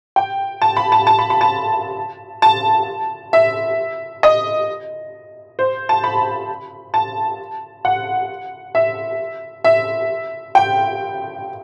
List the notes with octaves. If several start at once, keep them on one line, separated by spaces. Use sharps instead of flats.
G5
A5
B5
A5
A5
B5
B5
A5
A5
E5
D#5
C5
A5
B5
A5
F#5
E5
E5
G5